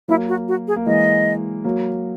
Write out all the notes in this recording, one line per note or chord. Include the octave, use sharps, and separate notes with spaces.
F#3 A#3 E4
F#4
F#4
G#4
A#3
E3 G#3 D#5
F#3 A#3